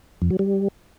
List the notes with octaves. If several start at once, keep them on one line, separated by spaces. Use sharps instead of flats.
F2
F#3
G3